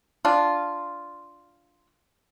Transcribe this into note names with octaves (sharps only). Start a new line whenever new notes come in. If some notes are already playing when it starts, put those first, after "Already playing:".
D4 F4